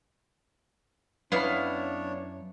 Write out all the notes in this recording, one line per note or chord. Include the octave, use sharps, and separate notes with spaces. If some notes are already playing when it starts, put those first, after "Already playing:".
F#2 B3 D4 E4 C#5 F5 B5